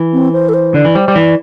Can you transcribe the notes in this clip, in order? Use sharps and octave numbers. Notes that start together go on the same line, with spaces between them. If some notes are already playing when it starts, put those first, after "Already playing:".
Already playing: E3
C4
C5
A4
C5
D3 D5
E3
G3 C5
G3
E3 D5